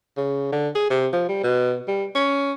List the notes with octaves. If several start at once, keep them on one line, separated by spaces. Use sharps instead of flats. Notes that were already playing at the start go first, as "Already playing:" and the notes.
C#3
D3
G#4
C3
F3
G3
B2
G3
C#4